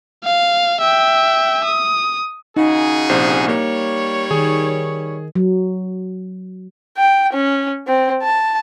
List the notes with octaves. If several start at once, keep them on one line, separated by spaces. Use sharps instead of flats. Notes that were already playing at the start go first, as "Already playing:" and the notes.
F5
E5 G5
D#6
C#3 D#4 F#4 G#4
A#1 C3 C5
G3 A#3 C#5
D#3 G#4
F#3
G5
C#4
C4
A5